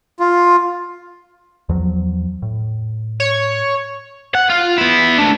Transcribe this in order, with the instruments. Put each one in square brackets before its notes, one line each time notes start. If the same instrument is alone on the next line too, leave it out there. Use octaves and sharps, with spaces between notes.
[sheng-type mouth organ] F4
[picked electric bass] E2 F3 F#3
A2
[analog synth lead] C#5
[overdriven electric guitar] F#5
F4
B3 E4
A3 D4